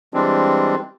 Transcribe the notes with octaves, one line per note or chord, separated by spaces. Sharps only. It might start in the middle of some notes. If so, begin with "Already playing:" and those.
E3 G3 G#3 C4 D4